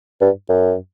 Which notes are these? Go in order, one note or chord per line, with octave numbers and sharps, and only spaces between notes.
G2
F#2